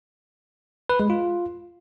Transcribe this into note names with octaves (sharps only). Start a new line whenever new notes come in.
B4
G#3
F4